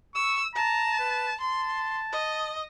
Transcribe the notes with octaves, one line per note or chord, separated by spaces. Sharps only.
C#6 E6
A5 A#5
B4
A5 C6
D#5